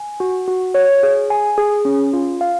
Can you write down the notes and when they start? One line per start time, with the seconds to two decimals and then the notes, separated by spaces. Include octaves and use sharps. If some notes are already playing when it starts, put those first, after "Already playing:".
Already playing: G#5
0.20 F#4
0.48 F#4
0.74 C#5
1.03 G#4
1.30 G#5
1.58 G#4
1.85 C#4
2.13 F4
2.41 F5